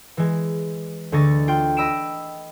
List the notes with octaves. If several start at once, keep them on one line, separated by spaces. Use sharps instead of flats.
E3 G#3
D2 D3 D#5 C#6 A6
F4 G5
D#5 B5 E6 D7 E7